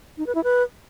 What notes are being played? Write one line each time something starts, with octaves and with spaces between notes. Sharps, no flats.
D#4
B4
E4
B4